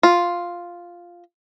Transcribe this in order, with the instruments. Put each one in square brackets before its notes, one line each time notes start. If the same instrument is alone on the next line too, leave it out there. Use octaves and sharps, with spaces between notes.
[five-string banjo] F4